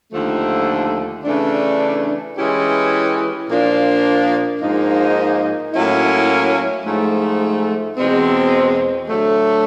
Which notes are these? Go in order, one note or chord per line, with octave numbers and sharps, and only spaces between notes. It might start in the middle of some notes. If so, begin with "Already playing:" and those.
D#2 D3 F3 A3
C#3 E3 A3 D4
E3 G#3 C#4 E4 G4
A#2 F3 A#3 D4
G#2 F3 A#3 D#4
A2 F#3 A#3 C#4 E4
G#2 F3 A3
E2 B2 G#3 C4
D3 F#3 A3